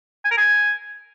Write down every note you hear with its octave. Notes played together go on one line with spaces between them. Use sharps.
G#5
A#4
G#5